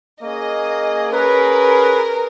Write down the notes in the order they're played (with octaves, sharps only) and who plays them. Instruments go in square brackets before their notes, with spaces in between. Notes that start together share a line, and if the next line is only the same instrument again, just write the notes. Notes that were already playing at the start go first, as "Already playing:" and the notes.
[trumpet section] A#3 C#4 G#4 [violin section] D#5
[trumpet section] C#4 G#4 B4 [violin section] A#4